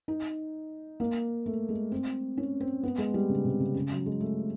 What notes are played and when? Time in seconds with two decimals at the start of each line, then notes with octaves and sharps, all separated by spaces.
0.08 D#4
1.00 A#3
1.46 A3
1.69 G#3
1.92 C4
2.37 C#4
2.61 C4
2.83 B3
2.98 G#3
3.14 G3
3.29 C#3
3.45 C3
3.60 C#3
3.75 C#3
3.91 F#3
4.06 G#3
4.20 A3